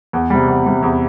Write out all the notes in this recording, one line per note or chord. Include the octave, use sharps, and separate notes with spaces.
E2
C3 G3
E2
C3 G3
E2